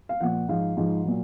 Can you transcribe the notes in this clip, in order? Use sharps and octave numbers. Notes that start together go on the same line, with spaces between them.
F5
A#2 F3 F#5
G#2 F3 F5
G#2 F3
A#2 F#3